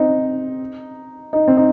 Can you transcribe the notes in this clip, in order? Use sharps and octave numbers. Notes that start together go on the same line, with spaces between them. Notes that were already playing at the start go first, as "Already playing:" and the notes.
Already playing: C4 D#4
D#4
C4
D#4